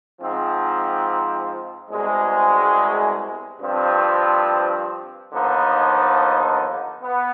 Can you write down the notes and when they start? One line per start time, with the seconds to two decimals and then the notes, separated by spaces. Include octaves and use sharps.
0.20 G#2 F3 C4
1.90 C2 B2 G#3
3.61 G2 F3 C4
5.32 D#2 D3 F3 B3 D#4
7.03 B3